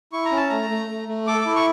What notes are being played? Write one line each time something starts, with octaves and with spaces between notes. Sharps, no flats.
E4 C#6
A#5
C#4
A5
A3 A#5
A3
A3
A3
A4 D6
E4 D6
C#6